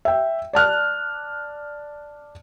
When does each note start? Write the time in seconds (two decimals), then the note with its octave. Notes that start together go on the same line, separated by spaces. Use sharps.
0.05 E5 G5
0.53 D5 A5 F6 F#6